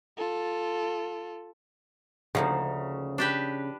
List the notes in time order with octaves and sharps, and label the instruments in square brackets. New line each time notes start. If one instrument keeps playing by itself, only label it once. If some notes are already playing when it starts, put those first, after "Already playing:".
[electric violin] F4 A4
[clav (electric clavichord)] D2 [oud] C#3 [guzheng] F3 A#3 D#4
[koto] D4 G4 B4